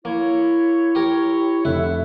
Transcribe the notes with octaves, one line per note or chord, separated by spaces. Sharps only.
A#3 E4 C#5
G4 A#4
F1 E4 E5 F#5